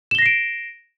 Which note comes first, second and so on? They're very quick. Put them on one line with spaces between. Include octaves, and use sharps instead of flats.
E7 G7 A#6 C7 D7